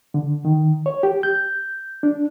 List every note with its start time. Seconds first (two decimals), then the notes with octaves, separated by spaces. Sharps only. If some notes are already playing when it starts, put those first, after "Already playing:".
0.14 D3
0.45 D#3
0.86 C#5
1.03 G4
1.23 G6
2.03 D4